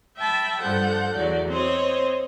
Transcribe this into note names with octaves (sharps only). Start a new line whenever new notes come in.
E5 G5 A5 B5
G2 F3 A4 F#5 G6
E2 F#3 D5
C4 C5 C#5 D#5